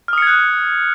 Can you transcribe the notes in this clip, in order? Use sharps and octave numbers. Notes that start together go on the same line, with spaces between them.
D#6 F6 F#6 G#6 C#7